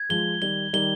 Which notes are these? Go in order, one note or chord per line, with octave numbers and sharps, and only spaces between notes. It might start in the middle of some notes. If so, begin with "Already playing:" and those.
Already playing: G#6
F3 G#3 G7
D#3 G3 G7
D#3 G3 G7